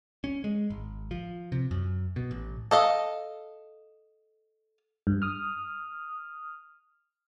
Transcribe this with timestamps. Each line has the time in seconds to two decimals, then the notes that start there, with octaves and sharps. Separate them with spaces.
0.24 C#4
0.44 G#3
0.70 G#1
1.11 F3
1.52 C3
1.71 F#2
2.16 B2
2.31 A1
2.71 A4 D#5 F5
5.07 G2
5.22 D#6 F6